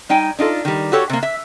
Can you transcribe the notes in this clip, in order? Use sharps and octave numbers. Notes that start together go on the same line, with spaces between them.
G3 D#4 G5 G#5
D4 D#4 F4 A4
D#3 G3
F#4 G4 A4 C#5
C3 A#3
E5